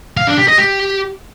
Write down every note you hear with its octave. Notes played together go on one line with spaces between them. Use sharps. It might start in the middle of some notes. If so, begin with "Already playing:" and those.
F5
D4
G4
D#5
G4